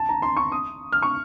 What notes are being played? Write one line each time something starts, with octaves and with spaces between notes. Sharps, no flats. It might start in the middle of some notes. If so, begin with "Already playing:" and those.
Already playing: A5
A#5
C6
C#6
D#6
F6
C#6